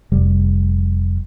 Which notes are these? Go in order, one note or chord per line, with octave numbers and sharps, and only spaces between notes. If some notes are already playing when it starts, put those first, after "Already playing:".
F1 G3